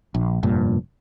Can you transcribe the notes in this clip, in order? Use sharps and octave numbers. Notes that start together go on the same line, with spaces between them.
A#1
F1 G2 A#2